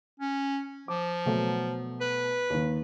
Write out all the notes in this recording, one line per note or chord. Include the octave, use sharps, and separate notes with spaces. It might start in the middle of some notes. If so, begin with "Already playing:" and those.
C#4
F3 D6
B2 F#3 A3
B4
D#2 D#3